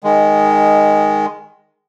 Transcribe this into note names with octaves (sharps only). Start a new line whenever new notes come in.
D#3 G#3